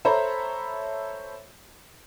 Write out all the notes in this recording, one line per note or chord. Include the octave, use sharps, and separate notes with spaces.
A4 C5 C#5 E5 A#5 B5